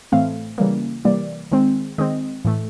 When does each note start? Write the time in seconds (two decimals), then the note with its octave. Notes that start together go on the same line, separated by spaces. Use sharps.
0.12 A2 E3 A3 C4 F5
0.58 C#3 E3 G3 A#3
1.05 C3 E3 G3 A#3 D5
1.51 D#3 G#3 C4
1.98 D#3 G#3 C4 D#5
2.45 A2 E3 A3